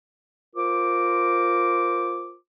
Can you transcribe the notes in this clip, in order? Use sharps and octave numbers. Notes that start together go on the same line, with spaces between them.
F4 A#4 C5 D6